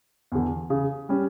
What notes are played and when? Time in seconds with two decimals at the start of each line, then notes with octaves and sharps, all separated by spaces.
0.32 E2 D3
0.70 C#3
1.09 G3 C#4